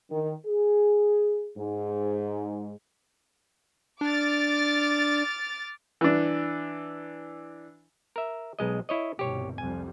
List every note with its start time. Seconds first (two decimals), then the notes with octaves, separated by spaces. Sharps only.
0.11 D#3
0.46 G#4
1.57 G#2
4.01 D4 D6 F6 A6
6.01 E3 D4
8.16 A#4 E5
8.59 B1 G#3 D#5
8.89 E4 C#5 D#5
9.19 G1 C2 B2 G4 C#5
9.58 C2 F2 G3 G#5